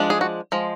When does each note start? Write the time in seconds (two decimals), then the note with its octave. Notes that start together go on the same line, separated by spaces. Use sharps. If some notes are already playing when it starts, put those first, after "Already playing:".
Already playing: F3 G#3 D4
0.10 G#4
0.21 F#4
0.52 F3 G#3